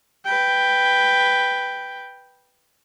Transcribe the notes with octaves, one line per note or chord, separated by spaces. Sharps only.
B4 G5